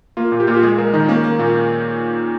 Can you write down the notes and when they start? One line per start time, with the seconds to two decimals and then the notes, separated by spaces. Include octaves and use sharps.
0.17 A#3 F4
0.32 A#2
0.40 G4
0.47 A#2 F4
0.54 G4
0.63 G#3 G#4
0.78 G#3 A#4
0.93 D#3 D#4
1.09 A#3 C#4
1.24 A#3
1.39 A#2